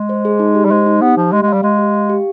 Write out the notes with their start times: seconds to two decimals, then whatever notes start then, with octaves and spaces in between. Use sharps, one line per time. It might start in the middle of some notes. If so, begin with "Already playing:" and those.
Already playing: G#3
0.09 C5
0.25 G#4
0.39 D#4
0.55 G4
0.65 G3
0.71 G#3 C5
0.86 D#4
1.01 B3 G4
1.16 F3 F5
1.32 G#3 G4
1.43 G#3
1.48 G3 F5
1.63 G#3 F5
1.79 G4
1.94 F5
2.09 G4